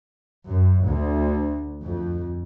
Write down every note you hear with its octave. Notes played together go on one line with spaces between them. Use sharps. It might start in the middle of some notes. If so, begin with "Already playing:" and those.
F#2
D2
F2